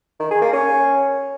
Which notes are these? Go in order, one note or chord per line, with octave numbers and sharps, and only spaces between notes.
D#3
G#4
A#3
C#4